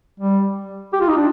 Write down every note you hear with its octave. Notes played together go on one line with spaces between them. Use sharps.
G3
G4
F4
D#4
D4